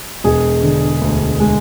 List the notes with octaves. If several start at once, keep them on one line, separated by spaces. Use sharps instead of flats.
E1 G#4
D3
D2
G#3